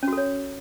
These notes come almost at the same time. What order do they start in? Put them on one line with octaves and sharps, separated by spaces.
C#4 F#4 A4 C#5